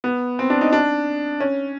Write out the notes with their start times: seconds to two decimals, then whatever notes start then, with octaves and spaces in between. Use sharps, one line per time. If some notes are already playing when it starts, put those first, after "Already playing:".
0.04 B3
0.39 C4
0.50 D4
0.61 D#4
0.73 D4
1.40 C#4